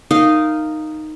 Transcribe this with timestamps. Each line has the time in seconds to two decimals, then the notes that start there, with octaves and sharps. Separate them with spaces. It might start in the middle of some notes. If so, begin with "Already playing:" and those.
0.11 D#4 A#4 D#5 F5